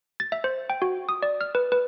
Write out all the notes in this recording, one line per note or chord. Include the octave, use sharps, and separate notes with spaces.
A6
E5
C5
G5
F#4
D#6
D5
F6
B4
B4